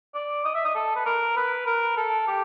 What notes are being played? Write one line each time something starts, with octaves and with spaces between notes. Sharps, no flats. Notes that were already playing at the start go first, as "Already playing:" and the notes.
D5
D#5
E5
D#5
A4
B4
A#4
B4
A#4
A4
G4